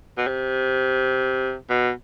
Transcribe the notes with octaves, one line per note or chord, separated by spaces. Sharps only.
B2
C3
B2